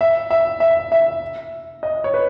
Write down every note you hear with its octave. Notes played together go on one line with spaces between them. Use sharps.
E5
E5
E5
E5
D#5
C#5
B4